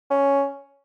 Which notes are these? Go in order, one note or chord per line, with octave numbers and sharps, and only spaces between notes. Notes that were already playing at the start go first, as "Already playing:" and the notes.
C#4